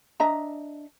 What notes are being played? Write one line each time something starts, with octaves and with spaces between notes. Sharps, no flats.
D4 D#5 E5 A#5